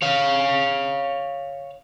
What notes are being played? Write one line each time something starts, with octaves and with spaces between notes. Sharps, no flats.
C#5 F5